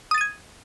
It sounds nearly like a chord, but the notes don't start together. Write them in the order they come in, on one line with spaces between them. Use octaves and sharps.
D#6 A6 D#7 G#6